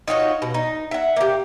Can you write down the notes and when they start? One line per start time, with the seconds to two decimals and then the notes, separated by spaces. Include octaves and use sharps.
0.08 D#4 F4 F#4 C#5
0.42 B2
0.54 D#4
0.91 E5 F#5
1.16 A#3 G4